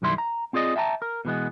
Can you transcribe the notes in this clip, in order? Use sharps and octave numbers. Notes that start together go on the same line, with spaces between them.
B1 F#2 D#3 G3 E4 C6
A#5
C4 F4 G#4 D5 D#5
E5 G5 A5 A#5
A#4
B2 E3 G#3 B3